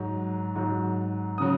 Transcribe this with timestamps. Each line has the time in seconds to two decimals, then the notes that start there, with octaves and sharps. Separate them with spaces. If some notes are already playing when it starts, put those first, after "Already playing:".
Already playing: G#2 F#3
0.55 G#2 F#3
1.38 C#3 F#3 D#6